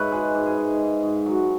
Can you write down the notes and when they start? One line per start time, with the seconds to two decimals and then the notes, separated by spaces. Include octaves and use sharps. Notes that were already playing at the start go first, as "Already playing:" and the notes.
Already playing: G#2 B4 C#5 E5
0.12 G#3 G#4
0.35 G#2
0.46 G#4
0.57 G#2
0.80 G#2
1.03 G#2
1.26 F#3